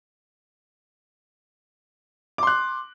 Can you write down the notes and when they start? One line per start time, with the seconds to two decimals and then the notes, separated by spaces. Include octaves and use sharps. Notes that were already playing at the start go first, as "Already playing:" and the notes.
2.38 D6
2.43 C6
2.47 F#6